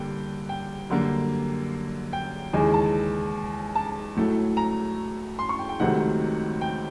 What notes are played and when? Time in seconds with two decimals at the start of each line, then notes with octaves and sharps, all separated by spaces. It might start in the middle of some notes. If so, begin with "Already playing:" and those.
Already playing: G2 D3 G3 A#3 G5
0.49 G5
0.90 F#2 D3 G3 A#3
2.13 G5
2.53 D#2 C#3 E3 G#3 G#5
2.74 A5
3.75 A5
4.16 A2 F#3 A3
4.57 A#5
5.39 C6
5.49 C#6
5.59 G5
5.69 G5
5.80 C#2 C3 D#3 F#3 A3 F#5
6.61 G5